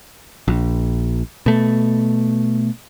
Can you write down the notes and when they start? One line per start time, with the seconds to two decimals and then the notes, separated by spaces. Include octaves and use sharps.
0.48 A#1
1.46 B2 A3